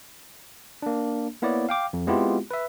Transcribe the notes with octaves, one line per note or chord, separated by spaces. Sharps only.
A#3 D4
A#3 B3 E4 C#5 D5
F5 G5 D6
F2
G#3 B3 C4 E4 F4 G4
B4 E5